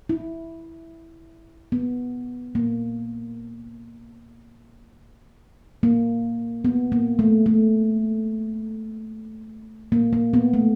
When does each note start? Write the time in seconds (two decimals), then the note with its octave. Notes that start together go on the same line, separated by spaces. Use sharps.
0.09 E4
1.72 B3
2.55 A#3
5.83 A#3
6.65 B3
6.92 A#3
7.19 A3
7.46 A3
9.92 A#3
10.13 A#3
10.34 B3
10.54 A3